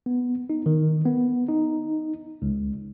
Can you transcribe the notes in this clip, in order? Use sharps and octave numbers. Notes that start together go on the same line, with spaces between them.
B3
D#4
D#3
B3
D#4
C#2